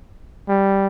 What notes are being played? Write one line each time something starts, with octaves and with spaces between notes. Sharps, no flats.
G3